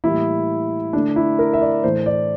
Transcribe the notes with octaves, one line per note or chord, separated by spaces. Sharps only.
A2 E3 G3 A#3 E4
D3 A3 D4
E4
A#4
E5
D5
A2 E3 A3 C5
D5